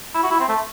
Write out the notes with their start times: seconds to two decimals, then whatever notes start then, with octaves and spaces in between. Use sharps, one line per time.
0.15 E4
0.23 F#4
0.31 E4
0.40 C4
0.49 A3